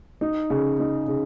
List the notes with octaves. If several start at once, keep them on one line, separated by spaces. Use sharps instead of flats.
D#4
C#3
D#4
C#3